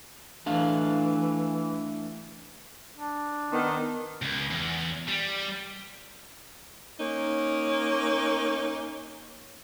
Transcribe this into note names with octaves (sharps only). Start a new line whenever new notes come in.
E3 A3 D4 F5
D4
D#3 B3
C#2
E2
G3
A#3 C#4 D#4